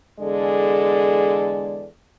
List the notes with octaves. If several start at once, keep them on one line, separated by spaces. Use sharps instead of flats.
E2 D3 G#3 G#4 A4 D5